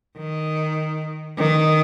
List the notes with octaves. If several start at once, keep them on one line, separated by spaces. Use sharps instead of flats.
D#3
D#3